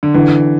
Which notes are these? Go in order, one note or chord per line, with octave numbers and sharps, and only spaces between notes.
D3
D3 E3